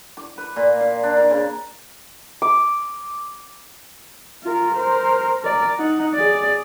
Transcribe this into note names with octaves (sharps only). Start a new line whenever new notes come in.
D6
B4
A#2
F5
D4
A#4
C#3
D6
F4 A#4
A#4 C5
A#4 D5
D#4 F#5
G#4 D5